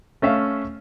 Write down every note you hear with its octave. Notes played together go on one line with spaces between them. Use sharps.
A3 C#4 E5 F5